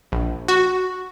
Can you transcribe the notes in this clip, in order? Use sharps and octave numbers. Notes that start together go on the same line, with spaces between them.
A#1
F#4